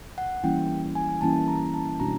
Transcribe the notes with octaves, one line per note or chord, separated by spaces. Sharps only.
F#5
E3 G3 A#3 C#4 E4 G5
G#5
E3 G3 A#3 C#4 E4 A5
A#5
A5
B2 G3 B3 D4 F#4 A#5